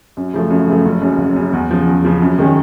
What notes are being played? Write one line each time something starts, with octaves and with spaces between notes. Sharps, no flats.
F#2
C#3 F3 A3
F#2
C#3 F3 A3
F#1
F#2 C#3
F#1
F#2 C#3
E2
C#3 F3
E2
C#3 F3
F#2
D#3 G#3 C#4